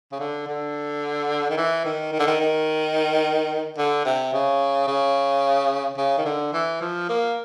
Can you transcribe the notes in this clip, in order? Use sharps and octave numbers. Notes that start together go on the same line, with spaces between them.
C#3
D3
D3
D#3
E3
D#3
D#3
D3
D#3
D#3
D3
C3
C#3
C#3
C#3
D#3
D3
E3
F3
A#3